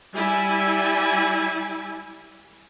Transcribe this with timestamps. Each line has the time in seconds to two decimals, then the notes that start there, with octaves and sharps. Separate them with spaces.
0.15 G3 E4 G#5